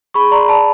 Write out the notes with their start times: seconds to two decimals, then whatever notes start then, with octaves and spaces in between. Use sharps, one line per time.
0.14 G#4 B5 C#6
0.31 D5 A#5 C6
0.49 D5 A5 B5